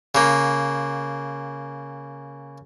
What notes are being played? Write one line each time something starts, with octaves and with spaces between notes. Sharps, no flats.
C#3 A#3